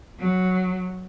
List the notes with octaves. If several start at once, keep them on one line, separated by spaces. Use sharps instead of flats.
F#3